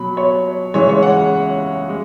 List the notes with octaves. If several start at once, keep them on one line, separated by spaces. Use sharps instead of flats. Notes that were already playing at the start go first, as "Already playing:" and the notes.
Already playing: B2 F#3 B5
C#5
C#3 E3 G#3 C#5
C#5
F#5
G#3